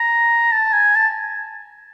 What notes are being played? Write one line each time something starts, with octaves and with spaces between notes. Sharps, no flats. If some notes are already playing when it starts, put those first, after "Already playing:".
Already playing: A#5
A5
G#5
A5